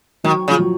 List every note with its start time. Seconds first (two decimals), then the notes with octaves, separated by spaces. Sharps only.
0.24 D#3 F#3
0.48 C#3
0.50 F3
0.59 F#3